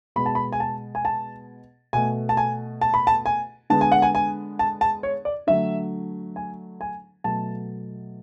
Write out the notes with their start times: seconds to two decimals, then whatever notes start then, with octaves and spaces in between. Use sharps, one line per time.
0.16 B2 G#3 B3 B5
0.26 A5
0.35 B5
0.53 G#5
0.60 A5
0.95 G#5
1.05 A5
1.93 B2 A3 G#5
2.29 A5
2.37 G#5
2.81 A5
2.94 B5
3.07 A5
3.26 G#5
3.70 D3 G#3 B3 A5
3.81 G#5
3.92 F#5
4.02 G#5
4.15 G#5
4.59 A5
4.81 A5
5.03 C#5
5.25 D5
5.47 D3 F#3 A3 E5
6.36 G#5
6.81 G#5
7.24 B2 F#3 A3 A5